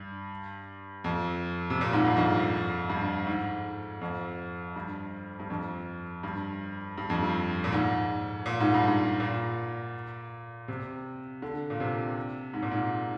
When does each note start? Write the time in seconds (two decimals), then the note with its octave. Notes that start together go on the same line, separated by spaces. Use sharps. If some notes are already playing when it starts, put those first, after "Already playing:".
Already playing: G2
1.04 F2
1.70 C3
1.81 A#2
1.93 G#2
2.05 G2
2.16 F2
2.90 G2
3.27 G#2
4.01 F2
4.76 G2
5.40 G2
5.50 F2
6.23 G2
6.98 G2
7.10 F2
7.22 G2
7.64 A#2
7.72 G#2
8.46 A#2
8.60 G#2
8.74 G2
8.88 G#2
9.20 A#2
10.68 C3
11.42 D3
11.70 A#2
11.80 C3
12.54 G#2
12.62 A#2
12.71 G#2